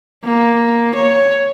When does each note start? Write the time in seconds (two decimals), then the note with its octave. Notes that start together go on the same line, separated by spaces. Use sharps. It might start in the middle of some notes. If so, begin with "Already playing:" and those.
0.24 A#3
0.95 C#5